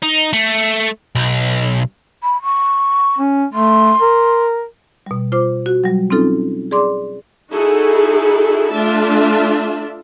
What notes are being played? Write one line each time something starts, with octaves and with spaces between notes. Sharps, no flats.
D#4
A3
B1
B5
C#6
C#4
A3 C6
A#4
B2 G3
F4 C5 D6
F#4
F#3 G3
C4 C#4 D#4 F4 A4
G#4 D5 C6 D6
D#4 E4 F#4 G#4 A4
A3 D4 F4 E5 A5